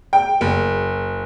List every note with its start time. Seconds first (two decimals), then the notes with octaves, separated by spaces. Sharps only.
0.13 G5
0.41 F#1